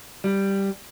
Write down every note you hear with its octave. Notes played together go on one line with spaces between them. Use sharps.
G3